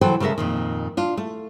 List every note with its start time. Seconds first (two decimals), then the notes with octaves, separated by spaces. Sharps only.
0.01 C3 E3 F#3 A4 C5 G5
0.20 C#3 G#3 A4 A#4 E5
0.38 F2 A#2 D#3
0.97 D4 F4
1.17 A3